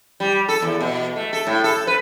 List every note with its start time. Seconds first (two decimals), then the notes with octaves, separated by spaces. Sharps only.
0.20 G3
0.49 A4
0.62 E2
0.81 B2
1.16 A3
1.33 A4
1.47 A2
1.64 A4
1.87 B4